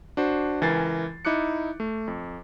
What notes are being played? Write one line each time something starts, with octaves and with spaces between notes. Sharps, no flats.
D4 F#4 C5
C#2 E3 A#4 G#5 A6 C7
D#4 E4 D6 F#6 C#7
A3
F2